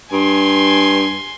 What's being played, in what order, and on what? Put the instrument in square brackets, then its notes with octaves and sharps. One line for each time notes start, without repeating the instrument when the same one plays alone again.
[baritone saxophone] G2 [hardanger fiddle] G#5 C6